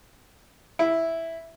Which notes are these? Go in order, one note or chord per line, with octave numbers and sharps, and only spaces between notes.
E4